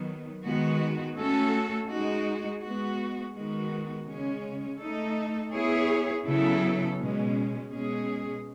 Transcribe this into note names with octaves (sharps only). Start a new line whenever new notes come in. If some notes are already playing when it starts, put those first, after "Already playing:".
Already playing: D#3 F#3 B3
D#3 G#3 B3 F#4
A3 C#4 F#4 A4
G#3 D#4 F#4
G#3 B3 F#4
D#3 G#3 B3 F#4
C#3 G#3 C#4
A3 D#4 A4
B3 E4 G#4 C#5
C#3 F#3 B3 E4 A4
B2 G#3 C#4
B2 G#3 C#4 G#4